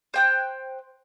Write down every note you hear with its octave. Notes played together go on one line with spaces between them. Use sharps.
C5 G5 F#6